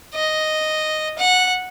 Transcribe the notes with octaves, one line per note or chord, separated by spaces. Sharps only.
D#5
F#5